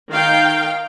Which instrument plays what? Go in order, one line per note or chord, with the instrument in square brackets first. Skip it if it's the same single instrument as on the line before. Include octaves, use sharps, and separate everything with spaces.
[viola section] D#3 F5 G5